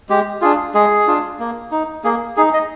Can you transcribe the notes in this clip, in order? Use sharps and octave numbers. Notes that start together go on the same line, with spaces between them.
G#3 G4
D4 F4 G#4
G#3 G#4
D4 F4
A#3
D#4
A#3 G#4
D#4 G#4
D#5